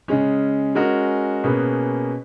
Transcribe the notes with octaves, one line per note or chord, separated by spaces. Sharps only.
C#3 G#3 C#4
G#3 C#4 F#4 A#4
B2 A#3 C#4 G#4 B4